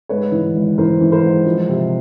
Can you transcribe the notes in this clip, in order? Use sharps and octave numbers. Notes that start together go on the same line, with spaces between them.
G#2 B4 C#5
E3
G#1
E3 A#4 C5
E3
A#4 C5
G#2
F3
C3